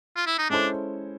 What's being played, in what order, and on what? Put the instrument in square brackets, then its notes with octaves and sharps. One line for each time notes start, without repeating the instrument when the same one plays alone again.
[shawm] F4
E4
D#4
[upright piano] G#3 C#4 E4 A4 C5 [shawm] D4